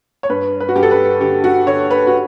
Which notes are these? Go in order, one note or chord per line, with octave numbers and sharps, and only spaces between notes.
C#5
G2 B4
B4
F#4
G2 G4
A4
B4
D3 G4
F#4
D3 C#5
B4
F#4